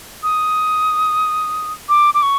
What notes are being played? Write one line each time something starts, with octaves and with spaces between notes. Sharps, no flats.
D#6
D6
D6
C#6